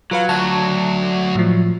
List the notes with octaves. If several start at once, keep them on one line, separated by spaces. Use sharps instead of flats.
F#3 F4 B4 F5
D2 A5
A2 F3